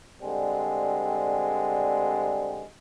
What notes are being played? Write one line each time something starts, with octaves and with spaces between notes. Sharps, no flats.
D3 G3 G#3 C4